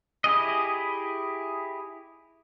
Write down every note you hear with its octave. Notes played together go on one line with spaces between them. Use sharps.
E4 G4 G#4 D#5